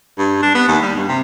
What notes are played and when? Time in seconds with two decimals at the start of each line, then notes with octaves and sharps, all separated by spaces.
0.18 G2
0.43 D4
0.55 B3
0.68 D#2
0.82 G3
0.96 G2
1.08 C3